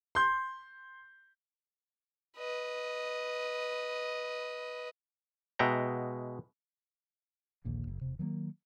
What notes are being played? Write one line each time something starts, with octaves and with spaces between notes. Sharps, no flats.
C6 G6
B4 D#5
B2 G#3 E5 F#5 G5 A#5
A#1 D#2 A#2 D3
F#1
E1 C3
D#3 F#3 A3 A#3